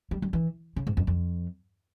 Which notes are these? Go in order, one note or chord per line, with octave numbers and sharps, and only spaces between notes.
G3
G3
E3
C#3
G#2
F2
F2